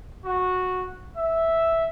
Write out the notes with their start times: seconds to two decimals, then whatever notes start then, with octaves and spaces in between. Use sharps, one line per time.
0.25 F#4
1.17 E5